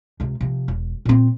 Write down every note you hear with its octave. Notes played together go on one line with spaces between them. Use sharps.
C#2 C3
C3 F3
E1
A#2 C4